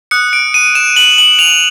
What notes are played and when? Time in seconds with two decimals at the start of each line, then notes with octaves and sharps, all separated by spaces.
0.11 D#6 F#6 C#7
0.33 D7
0.54 D#7
0.75 E7
0.96 F#7
1.18 F#7
1.39 F7